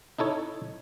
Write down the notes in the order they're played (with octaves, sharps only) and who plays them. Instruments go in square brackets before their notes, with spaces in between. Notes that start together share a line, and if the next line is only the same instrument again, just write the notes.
[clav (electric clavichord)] D#4 E4 A4 C#5